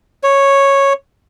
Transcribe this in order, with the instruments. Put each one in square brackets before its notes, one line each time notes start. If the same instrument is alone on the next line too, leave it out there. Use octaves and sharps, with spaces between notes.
[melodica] C#5